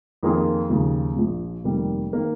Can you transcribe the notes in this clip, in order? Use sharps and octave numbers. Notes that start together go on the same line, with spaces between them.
F2 D#3 A#3 F4 G#4
D#2 C#3 F3
A#1 A#2 F3
F1 F2 D#3 G3 A#3
D#3 A#3